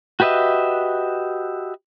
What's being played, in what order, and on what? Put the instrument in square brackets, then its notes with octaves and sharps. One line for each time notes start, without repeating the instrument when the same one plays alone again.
[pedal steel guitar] F#4 G4 B4 D#5 E5